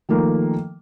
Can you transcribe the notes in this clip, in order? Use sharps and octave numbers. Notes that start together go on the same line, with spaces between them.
D#3 F3 A3 A#3